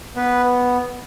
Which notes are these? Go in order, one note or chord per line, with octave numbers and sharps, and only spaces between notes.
B3 B4